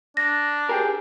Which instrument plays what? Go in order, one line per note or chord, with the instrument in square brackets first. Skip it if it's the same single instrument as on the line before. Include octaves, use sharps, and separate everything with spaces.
[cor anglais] D4 [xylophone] A#6
[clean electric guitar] G4 G#4 A#4 [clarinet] G5